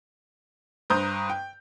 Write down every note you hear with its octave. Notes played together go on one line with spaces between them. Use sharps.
G2 C5 A#5 D#6 G6
G5